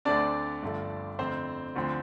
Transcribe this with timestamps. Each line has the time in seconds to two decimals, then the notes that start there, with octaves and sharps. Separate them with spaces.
0.05 D2 D3 A3 C4 D4 D5
0.63 G1 G2 D3 F3 A3
1.19 F2 D3 A3 C4 C5
1.75 D2 D3 F3 C4